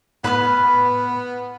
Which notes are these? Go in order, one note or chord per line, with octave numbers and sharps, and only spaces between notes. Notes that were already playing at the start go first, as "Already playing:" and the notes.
A2 B3 B4 B5 F6